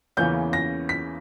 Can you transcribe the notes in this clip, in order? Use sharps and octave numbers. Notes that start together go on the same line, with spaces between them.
E2 C#3 E3 A#3 C#4 G6
A#6
B6